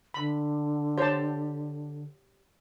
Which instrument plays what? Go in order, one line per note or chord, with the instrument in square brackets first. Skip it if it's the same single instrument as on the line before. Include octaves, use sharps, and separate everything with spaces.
[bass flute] D3 [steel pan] B5
[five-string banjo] G4 C#5 [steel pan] C5 A5